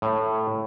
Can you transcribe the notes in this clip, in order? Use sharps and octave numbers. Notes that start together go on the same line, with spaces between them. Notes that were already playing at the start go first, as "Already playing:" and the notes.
A2